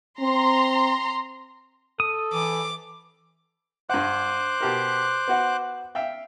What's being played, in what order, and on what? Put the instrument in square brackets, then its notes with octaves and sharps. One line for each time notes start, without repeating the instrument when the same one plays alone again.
[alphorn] C4 [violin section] A#5 C6
[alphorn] A4 [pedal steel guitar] D#6
[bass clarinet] E3 [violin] D6
[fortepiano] G2 F#5 [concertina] C5 D6 F#6
[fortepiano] B2 G4 A#4
B3 F#4 F#5
E5 F5 G5